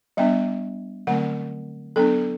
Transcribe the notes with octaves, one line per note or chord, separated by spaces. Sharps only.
G3 B3 D4 E5
D3 F#3 A3 C4 F#5
F#3 B3 D4 A4